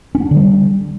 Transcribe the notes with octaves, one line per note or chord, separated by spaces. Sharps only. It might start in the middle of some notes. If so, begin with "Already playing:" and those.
C#4
B3
D4
D3
G3